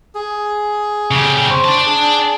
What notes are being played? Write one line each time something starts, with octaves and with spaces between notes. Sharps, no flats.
G#4
C#3 G4
C5 C#6
D5 A5
D4 G#4